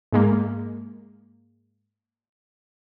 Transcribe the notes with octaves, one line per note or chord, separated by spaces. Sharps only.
G#2 G#3 A#3